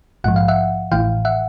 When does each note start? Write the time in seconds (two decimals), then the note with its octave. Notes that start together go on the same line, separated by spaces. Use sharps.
0.24 A#1 G#2 F3 F#5
0.36 F5
0.48 E5 F#5
0.92 A1 A2 E3 F5 G5
1.25 E5 F#5